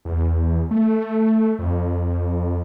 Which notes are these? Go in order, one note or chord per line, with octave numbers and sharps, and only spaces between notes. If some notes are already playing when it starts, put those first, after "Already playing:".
E2
A3
F2